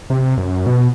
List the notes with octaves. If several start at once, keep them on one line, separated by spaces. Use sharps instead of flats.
C3
F#2
B2